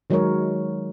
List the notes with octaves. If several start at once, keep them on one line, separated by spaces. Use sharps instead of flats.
D#3 F#3 G#3 D#4 A#4 C#5